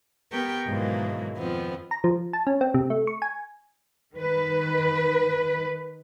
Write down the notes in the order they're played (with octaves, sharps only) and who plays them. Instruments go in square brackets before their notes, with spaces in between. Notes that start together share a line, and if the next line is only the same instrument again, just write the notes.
[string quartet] B3 G4 A#4 G5 C#6
G#2 B2 D#3 E3 F#3 A#3
F2 D#3 F3 B3 C4
[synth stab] A#5
F3
A5
C#4
C4
C3
A3
C#6
G#5
[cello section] D#3 B4